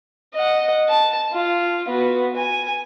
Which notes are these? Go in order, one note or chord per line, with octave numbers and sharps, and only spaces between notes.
D#5 F#5
A5
F4
B3 F#4
G#5